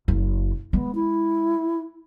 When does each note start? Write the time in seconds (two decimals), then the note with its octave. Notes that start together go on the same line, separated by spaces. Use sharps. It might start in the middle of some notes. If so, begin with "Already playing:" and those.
0.08 F#1
0.73 G#3 B3
0.95 E4